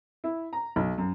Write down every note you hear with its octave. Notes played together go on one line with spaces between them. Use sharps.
E4
A#5
B1
F#2